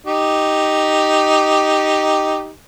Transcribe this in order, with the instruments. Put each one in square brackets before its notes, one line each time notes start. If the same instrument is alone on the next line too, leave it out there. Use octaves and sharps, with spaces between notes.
[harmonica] D#4 G4